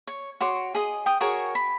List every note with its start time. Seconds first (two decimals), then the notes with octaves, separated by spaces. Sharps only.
0.07 C#5
0.41 F#4 C#5 C6 D6
0.75 G#4 D#5
1.06 G5 D#6
1.21 F#4 G#4 A#4 C#5
1.55 B5